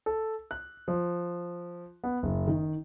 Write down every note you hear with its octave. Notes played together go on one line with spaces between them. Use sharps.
A4
F#6
F3
B3
F#1
D#3